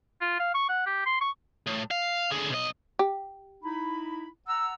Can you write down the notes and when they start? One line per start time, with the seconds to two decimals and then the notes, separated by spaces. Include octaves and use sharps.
0.21 F4
0.39 F5
0.54 C#6
0.69 F#5
0.86 G4
1.06 C6
1.21 C#6
1.67 A2
1.91 F5
2.31 D3 G#4
2.51 B1 D#5
2.99 G4
3.63 D#4 E4 B5
4.48 F#5 A#5 E6